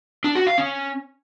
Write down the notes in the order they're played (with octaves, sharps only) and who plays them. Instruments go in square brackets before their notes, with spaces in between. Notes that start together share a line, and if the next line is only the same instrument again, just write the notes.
[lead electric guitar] D4
F#4
F5
C#4